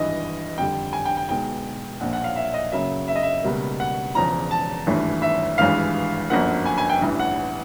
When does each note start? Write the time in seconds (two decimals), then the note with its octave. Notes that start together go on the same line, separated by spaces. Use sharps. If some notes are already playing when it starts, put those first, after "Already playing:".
Already playing: G#1 G2 E3 D#5
0.58 F2 D3 G3 G5
0.93 G#5
1.05 G5
1.17 G5
1.29 B1 B2 G#3 G5
2.01 A#1 A#2 F3 F#5
2.13 F#5
2.24 F5
2.36 E5
2.54 D#5
2.72 F#2 C#3 F#3 A#3 E5
3.08 E5
3.15 D#5
3.23 E5
3.43 C#2 B2 G3 A#3
3.80 F#5
4.15 E1 E2 C#3 F3 A#5
4.51 A5
4.86 G#1 G2 E3 A3
5.22 E5
5.58 G#1 G2 E3 G#3 F5
6.30 G1 F#2 D3 F3 A#3 F#5
6.65 G#5
6.78 G#5
6.89 G5
7.02 A1 G2 E3
7.19 F#5